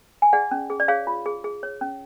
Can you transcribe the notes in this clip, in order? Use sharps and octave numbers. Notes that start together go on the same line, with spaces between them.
G#5
G#4 D5 F#5
C#4
G#4
D5
G#4 C#5 F5
F4
G#4
G#4
C#5
C#4